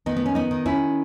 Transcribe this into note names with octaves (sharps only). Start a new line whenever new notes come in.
D#3 B3 D#4
B3
C#4
B3 D#4
D#3
C#4 E4